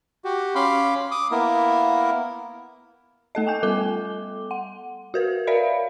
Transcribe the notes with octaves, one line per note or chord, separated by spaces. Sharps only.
F#4 G4
C#4 F5 B5 C6 D6
D6 D#6
A#3 B3 E4 A#4
A3 A4 D#5
G5 G#5 G6
G3 B3 A4 D6 G7
F#5
F#4 A#4 B4
A#4 C#5 D5 E5 F5 B5